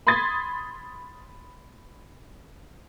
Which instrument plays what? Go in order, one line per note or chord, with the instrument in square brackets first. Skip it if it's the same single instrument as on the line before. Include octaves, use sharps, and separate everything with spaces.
[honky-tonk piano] B5 C6 D#6 G#6 A6 B6